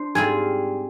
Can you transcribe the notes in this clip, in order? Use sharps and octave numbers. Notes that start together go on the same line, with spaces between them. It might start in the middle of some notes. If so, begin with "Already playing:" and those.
Already playing: D4 C5
G#2 G3 C4 F4 G#4